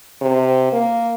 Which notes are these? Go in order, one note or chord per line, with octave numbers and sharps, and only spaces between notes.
C3
A#3